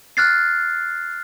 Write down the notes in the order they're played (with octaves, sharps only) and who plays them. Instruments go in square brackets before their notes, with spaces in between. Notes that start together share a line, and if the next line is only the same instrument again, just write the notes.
[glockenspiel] F6 F#6 A6 C7